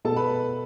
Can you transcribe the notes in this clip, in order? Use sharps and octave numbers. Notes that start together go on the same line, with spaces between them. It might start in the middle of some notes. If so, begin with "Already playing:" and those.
B2 A4 A5
B4 B5